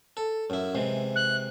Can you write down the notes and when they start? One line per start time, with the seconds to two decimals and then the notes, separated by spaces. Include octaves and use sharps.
0.17 A4
0.50 F#2 E4
0.75 C3 E3 G#3
1.16 F#6